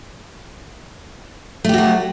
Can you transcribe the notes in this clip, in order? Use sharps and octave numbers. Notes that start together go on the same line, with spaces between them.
F#3 A3 F#4 G4